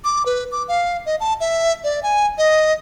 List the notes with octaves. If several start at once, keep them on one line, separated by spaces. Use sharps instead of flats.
D6
B4
D6
F5
D#5
A5
E5
D5
G#5
D#5